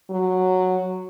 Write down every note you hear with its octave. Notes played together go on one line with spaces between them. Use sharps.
F#3